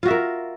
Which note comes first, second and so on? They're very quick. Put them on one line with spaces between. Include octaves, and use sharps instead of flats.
F4 F#4 E5 A#4